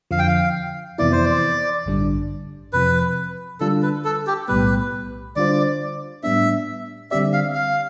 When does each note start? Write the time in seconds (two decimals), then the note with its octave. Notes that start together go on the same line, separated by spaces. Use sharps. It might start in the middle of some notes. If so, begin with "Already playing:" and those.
0.11 F2 D3 F3 F5
0.19 G5
0.28 F5
0.98 F2 C3 E3 B3 E4 D5
1.12 C5
1.25 D5
1.86 A1 G2 D3 G3 D4
2.73 F2 C3 F3 B4
3.61 D3 G3 D4 F4 A4
3.83 B4
4.04 A4
4.27 G4
4.48 B1 A2 G3 B3 B4
5.36 D3 G3 D4 F4 C5 D5
6.23 A2 G3 B3 D4 E5
7.11 D3 G3 C4 G4 D5 E5
7.33 F5
7.55 F5